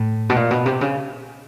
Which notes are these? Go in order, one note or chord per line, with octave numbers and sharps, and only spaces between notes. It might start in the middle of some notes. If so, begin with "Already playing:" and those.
Already playing: A2
B2
A#2
B2
C3
C#3